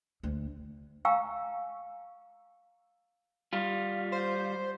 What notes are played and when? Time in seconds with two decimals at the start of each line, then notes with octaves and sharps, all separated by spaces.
0.24 D2
1.05 F5 G5 G#5 A#5 C#6 E6
3.53 G3 F4
4.12 C5